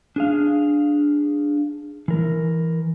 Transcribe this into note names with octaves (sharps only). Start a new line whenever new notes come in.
D4 G#4 F5
E3 A#4